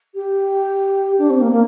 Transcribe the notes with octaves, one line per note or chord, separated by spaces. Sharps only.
G4
D4
C4
A#3
A#3